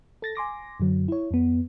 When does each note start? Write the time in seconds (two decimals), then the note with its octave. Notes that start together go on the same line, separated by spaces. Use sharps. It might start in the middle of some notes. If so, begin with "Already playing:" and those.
0.22 A4 A6 A#6
0.35 G#5 C6 D6 A#6
0.80 F#2 D3 F#3
1.08 E4 C#5
1.31 F2 B3